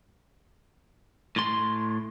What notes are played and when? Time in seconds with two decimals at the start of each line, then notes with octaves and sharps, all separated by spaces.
1.36 A2 C6